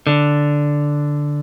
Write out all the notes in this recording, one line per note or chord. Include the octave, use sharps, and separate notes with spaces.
D3